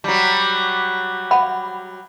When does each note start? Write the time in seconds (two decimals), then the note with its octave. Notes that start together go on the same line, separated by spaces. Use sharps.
0.04 F#3 G3
1.31 F5 F#5 B5